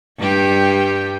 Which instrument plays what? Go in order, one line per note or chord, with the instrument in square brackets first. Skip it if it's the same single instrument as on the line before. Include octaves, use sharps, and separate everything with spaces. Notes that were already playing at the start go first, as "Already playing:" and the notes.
[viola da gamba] G2 G3 G4